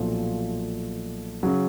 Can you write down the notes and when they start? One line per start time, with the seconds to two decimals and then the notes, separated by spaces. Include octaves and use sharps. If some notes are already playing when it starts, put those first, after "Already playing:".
Already playing: B1 A#2 F3 A3
1.43 C#3 F#3